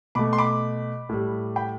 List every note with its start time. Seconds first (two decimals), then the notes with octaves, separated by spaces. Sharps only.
0.15 B2 A3 B5 D6
0.33 C6
0.38 B5 D6
1.09 A2 G3
1.56 G5 B5